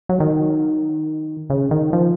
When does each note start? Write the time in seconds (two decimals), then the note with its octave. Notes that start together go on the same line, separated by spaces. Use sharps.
0.09 F#3
0.20 D#3
1.50 C#3
1.71 D#3
1.93 F3